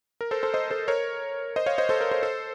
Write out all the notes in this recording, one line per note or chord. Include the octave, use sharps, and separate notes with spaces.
A#4
A4 C5
A4 C5
C5 D#5
A4 C5
A#4 C#5
C5 D#5
C#5 F5
C5 D#5
A4 C5
A#4
A4 C5
A4 C5